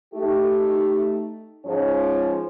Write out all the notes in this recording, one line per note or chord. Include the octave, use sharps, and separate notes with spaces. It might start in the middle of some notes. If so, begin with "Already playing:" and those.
A3 D#4 G4
G#2 F3 C#4